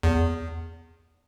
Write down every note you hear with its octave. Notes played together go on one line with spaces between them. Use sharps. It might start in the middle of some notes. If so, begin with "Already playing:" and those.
E2